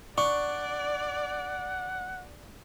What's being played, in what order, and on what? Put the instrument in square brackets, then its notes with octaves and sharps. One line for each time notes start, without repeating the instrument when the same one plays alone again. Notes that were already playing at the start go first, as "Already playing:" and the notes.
[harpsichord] D4 [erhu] D5 [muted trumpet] F#5 [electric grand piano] C#6